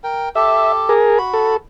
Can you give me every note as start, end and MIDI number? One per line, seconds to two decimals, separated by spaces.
0.04 0.29 70
0.04 0.29 79
0.35 0.93 67
0.35 0.93 69
0.35 0.72 76
0.89 1.19 68
0.89 1.19 70
1.18 1.55 66
1.18 1.55 83
1.34 1.57 69